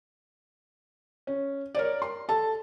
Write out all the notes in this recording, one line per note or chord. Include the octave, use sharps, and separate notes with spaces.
C#4
A#4 C#5 D5
C6
A4 A5